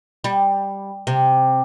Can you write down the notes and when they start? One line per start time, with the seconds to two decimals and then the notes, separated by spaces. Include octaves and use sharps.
0.24 G3
1.07 C3